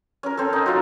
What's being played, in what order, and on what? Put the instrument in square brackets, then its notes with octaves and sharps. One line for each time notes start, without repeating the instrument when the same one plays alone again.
[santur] C#4 A#4
C4 C#4 A4
D#4
F#3 F4 F#5